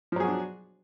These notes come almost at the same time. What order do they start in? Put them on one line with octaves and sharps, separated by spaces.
F3 F#3 G#4 F#4 D4